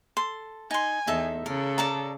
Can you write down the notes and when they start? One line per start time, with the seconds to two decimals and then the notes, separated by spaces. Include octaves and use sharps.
0.17 A4 C6
0.71 D#4 G#5 C6
1.07 E2 D#4 A4 E5
1.46 C#3 A4 A#4
1.78 D5 A5 A#5